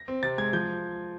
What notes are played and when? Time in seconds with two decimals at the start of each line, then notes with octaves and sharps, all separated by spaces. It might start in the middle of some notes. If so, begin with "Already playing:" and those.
Already playing: A#6
0.08 C4
0.23 C3 A6
0.38 G#3 G#6
0.53 F3 G6